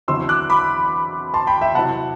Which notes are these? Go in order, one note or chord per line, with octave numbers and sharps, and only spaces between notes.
E2 D3 F#3 C4 E4 C6 E6
D6 F#6
B5 D6
A5 C6
G5 B5
E5 G5
C3 F#3 C4 E4 F#5 A5